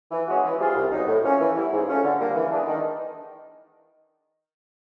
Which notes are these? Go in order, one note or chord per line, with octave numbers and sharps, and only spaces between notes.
E3
G#3 C#4 F#4
E3
G3 C4 F4 G#4
C2
B2 F#3 B3 D#4
A2
F3 A#3 C#4
E3
G3 B3 E4
G#2
F3 A3 C#4
D3
G3 A#3
E3
G#3 B3 D4
D#3